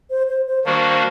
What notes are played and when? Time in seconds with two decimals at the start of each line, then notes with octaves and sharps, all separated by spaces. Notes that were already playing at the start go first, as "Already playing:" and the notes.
0.10 C5
0.29 C5
0.47 C5
0.65 D#3 G3 A#3 D4 F#4 C5